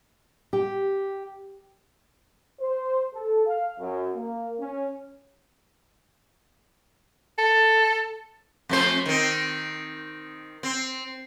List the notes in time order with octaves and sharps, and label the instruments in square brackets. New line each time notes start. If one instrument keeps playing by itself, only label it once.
[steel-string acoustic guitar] G4
[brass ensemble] C5
A4
F5
F#2
A#3
C#4
[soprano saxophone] A4
[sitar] F2 A3 C5
D#3 C4
C4